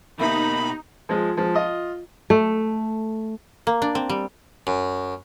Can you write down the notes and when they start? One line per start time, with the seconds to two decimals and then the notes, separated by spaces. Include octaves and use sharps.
0.20 B2 A#3 D#4 G4 E5 B5
1.09 F3 G#3
1.37 F3 G#3
1.54 F4 D#5
2.30 A3
3.67 A#3
3.82 D4
3.95 C4
4.10 G3
4.67 F#2